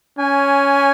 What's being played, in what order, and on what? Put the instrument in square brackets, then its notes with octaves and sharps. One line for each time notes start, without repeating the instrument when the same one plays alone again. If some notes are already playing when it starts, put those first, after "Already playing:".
[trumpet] C#4 [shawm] G#5